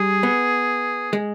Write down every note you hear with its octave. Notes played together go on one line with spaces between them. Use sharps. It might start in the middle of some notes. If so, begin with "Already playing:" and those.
Already playing: G3 G#4
B3
G#3